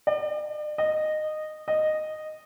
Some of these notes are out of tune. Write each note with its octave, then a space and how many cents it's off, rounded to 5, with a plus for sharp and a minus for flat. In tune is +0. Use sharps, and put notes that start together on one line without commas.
D5 +40
D#5 -15
D#5 -10